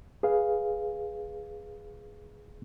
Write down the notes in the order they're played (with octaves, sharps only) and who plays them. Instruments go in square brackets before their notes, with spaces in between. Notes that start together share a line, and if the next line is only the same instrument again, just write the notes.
[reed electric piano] G#4 B4 F5